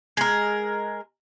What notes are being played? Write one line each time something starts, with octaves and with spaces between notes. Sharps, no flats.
G#3 A#4